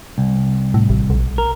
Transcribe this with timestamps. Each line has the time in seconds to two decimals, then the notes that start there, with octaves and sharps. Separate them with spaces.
0.18 C2
0.74 A2
0.90 A1
1.10 B1
1.38 A#4